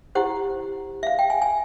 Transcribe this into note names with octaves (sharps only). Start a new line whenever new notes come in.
E4 G4 C5 F#5
E5
F5
G5
G#5
G#5